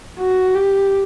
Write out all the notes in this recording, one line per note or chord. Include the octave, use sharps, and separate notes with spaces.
F#4
G4